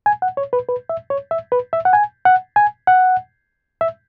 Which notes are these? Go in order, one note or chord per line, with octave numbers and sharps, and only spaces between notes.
G#5
F#5
C#5
B4
B4
E5
C#5
E5
B4
E5
F#5
G#5
F#5
G#5
F#5
E5